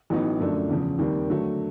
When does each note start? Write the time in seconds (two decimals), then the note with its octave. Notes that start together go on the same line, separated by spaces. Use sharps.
0.10 A1 A2 F#3 B3 D#4
0.40 F#2 D3 F3 A3 D4
0.69 E2 C#3 F3
0.98 D#2 D#3 G3 C4
1.28 D3 F#3 A3